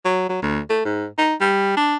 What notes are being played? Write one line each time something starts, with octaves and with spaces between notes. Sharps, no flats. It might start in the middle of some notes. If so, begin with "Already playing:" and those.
F#3
F#3
D2
A3
G#2
D#4
G3
D4